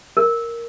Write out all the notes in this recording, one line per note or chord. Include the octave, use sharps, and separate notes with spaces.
A#4